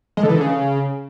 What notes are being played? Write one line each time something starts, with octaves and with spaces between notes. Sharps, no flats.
G#3
D3
E3
D3
C#3